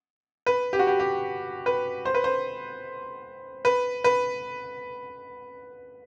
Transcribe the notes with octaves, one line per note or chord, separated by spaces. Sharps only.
B4
G4
F#4
G4
G4
B4
C5
B4
C5
B4
B4